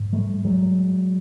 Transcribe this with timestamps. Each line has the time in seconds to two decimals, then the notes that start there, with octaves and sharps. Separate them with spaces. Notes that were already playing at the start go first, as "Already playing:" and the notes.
Already playing: G#2
0.13 G3 A3
0.45 F#3 G#3